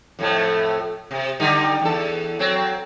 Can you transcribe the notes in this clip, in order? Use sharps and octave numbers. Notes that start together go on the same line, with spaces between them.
F2 A2 A3
C3
D3 G3 D#4
E2 A4
F#3 C4